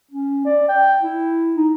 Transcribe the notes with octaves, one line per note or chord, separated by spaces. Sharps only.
C#4
D5
G5
E4
D#4